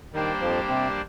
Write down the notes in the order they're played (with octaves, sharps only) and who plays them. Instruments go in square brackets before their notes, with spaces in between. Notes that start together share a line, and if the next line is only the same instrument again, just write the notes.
[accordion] D#3 [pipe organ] G3 A#3 D4 G4 C5
[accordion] F2 F3
C3 C4